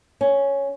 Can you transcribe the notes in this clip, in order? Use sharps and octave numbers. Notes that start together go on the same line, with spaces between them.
C#4